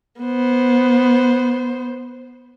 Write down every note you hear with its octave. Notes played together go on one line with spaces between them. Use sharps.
B3 C5